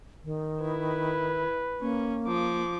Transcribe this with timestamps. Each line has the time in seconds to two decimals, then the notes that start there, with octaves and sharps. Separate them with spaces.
0.24 D#3
0.61 E4 B4
1.81 A#3 C#4
2.27 F3 D6